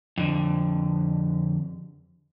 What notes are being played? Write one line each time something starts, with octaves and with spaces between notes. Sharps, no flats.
F2 D3